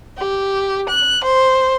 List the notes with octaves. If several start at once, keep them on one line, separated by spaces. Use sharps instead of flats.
G4
F#6
C5